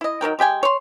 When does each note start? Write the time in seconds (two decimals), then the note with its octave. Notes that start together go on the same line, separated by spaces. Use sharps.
0.01 E4 D#5
0.21 D#3 F#3 A#4 G5
0.39 G#3 G4 G5 G#5
0.63 C#5 C6